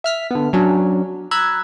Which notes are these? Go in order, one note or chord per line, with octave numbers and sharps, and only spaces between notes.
E5 F6 B6
D3 B3
F#3 C#4 D4
A#5 B5 E6 F#6 G#6